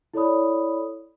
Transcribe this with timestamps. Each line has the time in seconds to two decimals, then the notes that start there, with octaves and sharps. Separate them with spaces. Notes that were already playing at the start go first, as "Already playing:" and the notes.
0.14 E4 A4 C#5 D5 B5 D#6